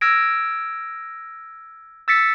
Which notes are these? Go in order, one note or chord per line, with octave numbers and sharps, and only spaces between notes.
E6 F6 G#6 A#6 D7
E6 A6 B6 C#7